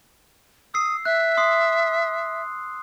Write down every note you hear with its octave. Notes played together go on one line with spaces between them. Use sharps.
D#6 E6 C7
E5 F#6
C6 D#6 C7